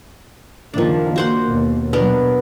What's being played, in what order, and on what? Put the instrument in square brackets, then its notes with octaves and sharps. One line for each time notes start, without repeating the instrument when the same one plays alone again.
[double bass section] F#1 D#3 A#3 [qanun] F3 D4
[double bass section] A#3 [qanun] F#4 C5 F#5
[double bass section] D#2 B2
[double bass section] B2 F#3 [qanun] B3 D4 A#4